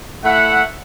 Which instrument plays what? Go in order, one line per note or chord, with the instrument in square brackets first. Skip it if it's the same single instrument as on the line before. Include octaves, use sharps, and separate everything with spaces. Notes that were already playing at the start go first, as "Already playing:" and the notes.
[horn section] A3 E4 E5 F#5